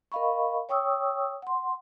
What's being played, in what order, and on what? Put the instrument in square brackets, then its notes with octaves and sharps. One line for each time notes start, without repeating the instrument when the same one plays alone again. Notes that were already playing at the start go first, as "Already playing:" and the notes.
[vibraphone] A#4 D#5 F5 B5 C#6
C#5 G5 C#6 D#6 E6
F#5 C6